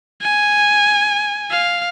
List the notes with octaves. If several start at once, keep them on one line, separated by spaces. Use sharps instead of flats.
G#5
F5